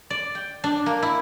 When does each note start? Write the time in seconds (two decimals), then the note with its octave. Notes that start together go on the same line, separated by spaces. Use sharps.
0.10 D5
0.35 G5
0.64 D4
0.86 A#3
1.02 E4